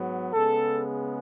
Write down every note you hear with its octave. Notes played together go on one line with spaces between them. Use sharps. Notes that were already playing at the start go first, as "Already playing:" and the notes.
Already playing: G#2 F#3 B3
C#3 G#3 B3 A4